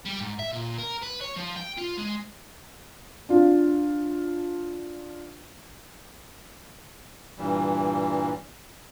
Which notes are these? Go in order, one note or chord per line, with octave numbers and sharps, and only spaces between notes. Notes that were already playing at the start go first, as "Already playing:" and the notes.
G3
G#2
E5
A#2
A#4
B4
C#5
F3
G5
F4
G#3
D4 F4
G2 A#2 E3 G3